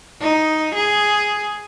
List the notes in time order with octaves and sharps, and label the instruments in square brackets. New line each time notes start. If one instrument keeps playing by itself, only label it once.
[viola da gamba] D#4
G#4